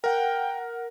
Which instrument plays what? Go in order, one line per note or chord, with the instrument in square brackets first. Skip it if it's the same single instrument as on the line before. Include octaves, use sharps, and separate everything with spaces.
[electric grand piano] A#4 F#5 [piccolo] G5